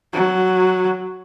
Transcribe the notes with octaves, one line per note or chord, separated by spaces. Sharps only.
F#3